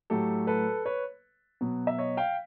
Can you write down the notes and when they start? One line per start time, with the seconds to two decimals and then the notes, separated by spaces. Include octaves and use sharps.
0.10 A2 F#3 A3 G4 A4
0.47 A4 B4
0.86 B4 C#5
1.61 B2 F#3 B3
1.87 E5
1.98 C#5 D#5
2.17 F5 G5